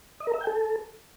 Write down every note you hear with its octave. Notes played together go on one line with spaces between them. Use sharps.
D#5
A#4
E5
G5
A4